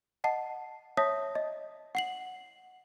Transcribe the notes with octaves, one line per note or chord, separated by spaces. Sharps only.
D#5 F#5 A5 C7
C#5 E5 A5 D#6 A#6 B6
D#5
F#5 C7 F#7